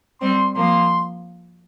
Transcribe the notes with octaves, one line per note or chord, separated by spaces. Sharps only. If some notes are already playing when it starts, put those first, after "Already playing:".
G3 C4 C6
F3 A#3 C6